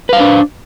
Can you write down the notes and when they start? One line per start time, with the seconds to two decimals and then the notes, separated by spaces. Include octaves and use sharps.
0.09 B4
0.13 F5
0.17 C5
0.20 D4